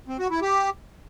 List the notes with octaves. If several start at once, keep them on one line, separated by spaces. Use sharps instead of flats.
C4
F#4
E4
G4